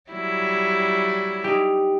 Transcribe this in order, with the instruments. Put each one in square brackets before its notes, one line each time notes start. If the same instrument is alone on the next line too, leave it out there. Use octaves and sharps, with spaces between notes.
[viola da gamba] F#3 G3 E4
[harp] D#4 G4